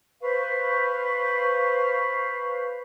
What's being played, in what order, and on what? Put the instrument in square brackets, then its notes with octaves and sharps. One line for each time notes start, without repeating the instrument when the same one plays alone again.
[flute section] B4 C5 F5 C#6